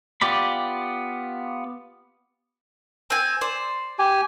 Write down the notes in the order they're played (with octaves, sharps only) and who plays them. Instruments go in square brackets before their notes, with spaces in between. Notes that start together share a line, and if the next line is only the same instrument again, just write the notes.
[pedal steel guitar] B3 F4 G4 D5 B5
[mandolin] C4 G#5
C5 D5
[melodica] G4 G#5